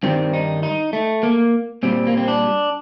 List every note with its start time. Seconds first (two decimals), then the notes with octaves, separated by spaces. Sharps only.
0.03 G2 D#3 G3 C4
0.33 D#4
0.63 D#4
0.93 A3
1.23 A#3
1.83 A#2 G3 C4
2.07 A#3
2.17 C4
2.28 D4